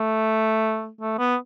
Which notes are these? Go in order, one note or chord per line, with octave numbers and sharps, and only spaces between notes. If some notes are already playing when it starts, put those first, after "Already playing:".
Already playing: A3
A3
B3